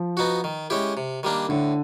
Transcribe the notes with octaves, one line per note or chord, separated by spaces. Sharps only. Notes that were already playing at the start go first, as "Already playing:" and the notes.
Already playing: F3
B3 D#4 F#4
D#3
G#3 C#4 E4 G4
C3
D#3 G3 A#3 D4
A2 D3